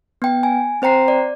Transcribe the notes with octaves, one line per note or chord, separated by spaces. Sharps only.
B3 G5
G#5
C4 C5 G5 A#5 C7
D5